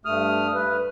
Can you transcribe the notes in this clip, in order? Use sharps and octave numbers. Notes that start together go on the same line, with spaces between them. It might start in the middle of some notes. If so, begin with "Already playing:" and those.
G2 A3 D#6 F6
B4